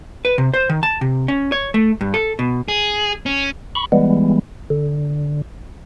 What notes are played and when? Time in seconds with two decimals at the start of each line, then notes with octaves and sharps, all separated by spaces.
0.25 B4
0.38 C3
0.54 C5
0.69 D#3
0.83 A5
1.01 C3
1.28 C#4
1.52 C#5
1.74 A3
2.01 G2
2.14 A4
2.39 B2
2.68 G#4
3.26 C#4
3.75 B5 C#6
3.92 E3 G3 G#3 B3
4.70 D3